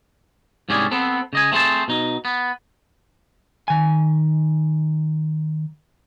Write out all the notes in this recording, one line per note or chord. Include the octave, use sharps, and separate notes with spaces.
C2 G#2 C#4 G4 G#4 D5
B3 C4 A4
C#3 D#5 G#5
A3 C4 G#4 C5 A5
B2 D#4
B3
D#3 G#5